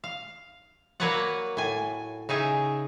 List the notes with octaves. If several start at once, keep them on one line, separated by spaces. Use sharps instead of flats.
F5
F#3 A#3 B4 C#5 D5 F#5
A2 G#5
C#3 D#4 G#4 E5